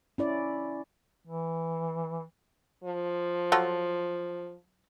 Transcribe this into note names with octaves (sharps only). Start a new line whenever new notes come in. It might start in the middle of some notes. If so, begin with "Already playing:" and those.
C#4 E4 D5
E3
F3
F#3 F4 A4